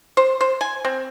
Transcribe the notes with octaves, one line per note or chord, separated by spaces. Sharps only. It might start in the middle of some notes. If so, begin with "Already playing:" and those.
C5
C5
G#5
C4